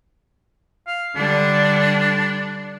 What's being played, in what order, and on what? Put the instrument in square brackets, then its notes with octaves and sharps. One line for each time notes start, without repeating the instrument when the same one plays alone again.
[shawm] F5
[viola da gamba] D3 G3 [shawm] D4